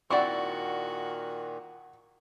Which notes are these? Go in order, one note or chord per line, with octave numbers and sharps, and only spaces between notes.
A#2 D#3 C4 E4 F#4 D5 F#5 C#6